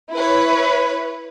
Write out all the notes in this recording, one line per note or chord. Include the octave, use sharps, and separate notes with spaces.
E4 B4 C#5